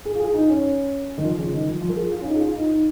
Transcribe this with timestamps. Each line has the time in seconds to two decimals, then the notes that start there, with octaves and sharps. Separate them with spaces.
0.05 G#4
0.15 F4
0.20 G#4
0.34 D#4
0.49 C#4
1.18 D#3
1.23 F3
1.38 C#3
1.53 D#3
1.68 F3
1.82 F3
1.89 A#4
1.96 G#4
2.12 F4
2.21 C#4
2.26 D#4
2.35 G#4
2.40 F4
2.55 D#4
2.69 D#4